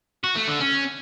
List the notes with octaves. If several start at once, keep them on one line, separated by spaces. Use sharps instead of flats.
F#4
A3
D3
C#4